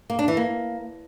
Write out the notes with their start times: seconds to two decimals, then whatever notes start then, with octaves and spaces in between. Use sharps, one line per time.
0.10 A#3
0.19 D4
0.28 E3
0.37 A#3